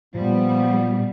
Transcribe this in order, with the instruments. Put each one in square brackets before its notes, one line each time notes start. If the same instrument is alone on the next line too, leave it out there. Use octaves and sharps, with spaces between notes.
[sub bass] A#2 [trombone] F3 [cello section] G3 [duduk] B3